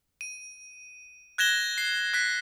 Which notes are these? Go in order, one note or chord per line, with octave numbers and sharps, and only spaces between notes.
D#7
F#6 G#6 A#6 E7 G7
C7
F#6 B6